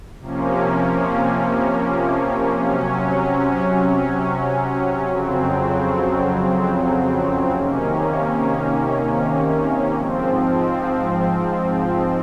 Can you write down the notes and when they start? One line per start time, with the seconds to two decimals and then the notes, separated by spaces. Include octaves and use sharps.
0.20 C3 F3 A#3 C#4
2.63 C3 F#3 C#4
5.07 F2 C#3 F#3 C4
7.51 C3 D#3 A#3 C#4
9.93 G#2 F3 C4